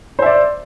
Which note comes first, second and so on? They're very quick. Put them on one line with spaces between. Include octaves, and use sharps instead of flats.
C5 E5 D5